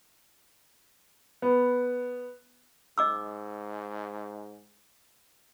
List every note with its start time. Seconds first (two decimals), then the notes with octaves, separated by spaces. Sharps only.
1.42 B3
2.98 G#2 D#5 D6 E6